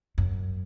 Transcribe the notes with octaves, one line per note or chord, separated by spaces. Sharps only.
F#2